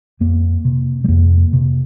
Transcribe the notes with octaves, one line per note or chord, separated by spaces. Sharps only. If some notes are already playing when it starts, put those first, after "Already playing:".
F2 A#3
C3
G3
F2 A#3
C3